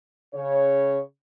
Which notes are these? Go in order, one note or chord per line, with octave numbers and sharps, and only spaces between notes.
C#3 C#5